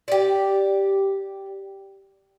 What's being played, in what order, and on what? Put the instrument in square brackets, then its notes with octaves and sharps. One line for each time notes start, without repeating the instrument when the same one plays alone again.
[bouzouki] G4 D5